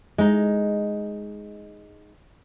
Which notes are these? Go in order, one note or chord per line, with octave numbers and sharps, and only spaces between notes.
G#3 D#4